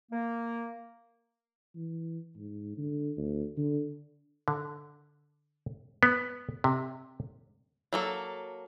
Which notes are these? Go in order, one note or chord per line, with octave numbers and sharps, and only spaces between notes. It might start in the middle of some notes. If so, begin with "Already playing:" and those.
A#3
E3
G#2
D3
D2
D3
D3
B3
C3
F#3 A#3 A4